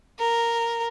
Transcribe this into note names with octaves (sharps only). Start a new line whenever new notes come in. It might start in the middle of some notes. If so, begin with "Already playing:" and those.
A#4